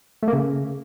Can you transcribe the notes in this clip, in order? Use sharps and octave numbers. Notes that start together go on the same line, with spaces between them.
A3
A#3
C#3